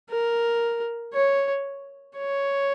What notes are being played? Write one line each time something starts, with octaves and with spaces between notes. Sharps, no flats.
A#4
C#5
C#5